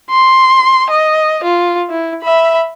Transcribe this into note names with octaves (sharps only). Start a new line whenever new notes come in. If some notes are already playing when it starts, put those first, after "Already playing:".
C6
D#5
F4
E4
E5 B5